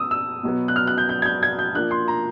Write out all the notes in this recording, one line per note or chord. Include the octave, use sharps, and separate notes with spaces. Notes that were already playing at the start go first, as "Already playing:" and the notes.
Already playing: B3 D#6 E6
E6
B2 F#3 B3
F#6
F6
F#6
G6
G6
G#6
G6
G#6
G6
F3 A#3 D4 F#6
C6
A#5